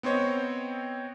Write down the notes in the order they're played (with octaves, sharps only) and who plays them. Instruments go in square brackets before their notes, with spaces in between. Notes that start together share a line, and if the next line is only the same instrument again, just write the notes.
[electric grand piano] B3 C4 C5 C#5 D#5